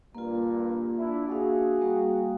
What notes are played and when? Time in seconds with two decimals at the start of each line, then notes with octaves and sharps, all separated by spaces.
0.15 G2 A#2 A#3 F4
0.97 D4 E4
1.28 A#3 D4 F#4 G#4 F5
1.81 G3 A#3 F5